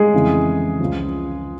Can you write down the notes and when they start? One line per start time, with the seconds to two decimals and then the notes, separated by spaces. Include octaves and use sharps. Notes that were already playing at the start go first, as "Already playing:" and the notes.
Already playing: G#3 G#4
0.14 F2 C#3 E3
0.80 C#2 C#3 F3